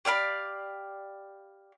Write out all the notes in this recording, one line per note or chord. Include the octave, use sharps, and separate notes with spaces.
G4 D5 F5 B5